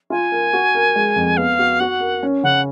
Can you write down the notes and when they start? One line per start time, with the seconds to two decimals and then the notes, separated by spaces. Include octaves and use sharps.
0.10 F4 G#5
0.32 A#4
0.53 F#4
0.75 A#4
0.95 G#3
1.16 F2
1.37 B3 F5
1.59 F#4
1.80 F#4 F#5
2.01 A#4
2.23 C#4
2.43 C#3 F#5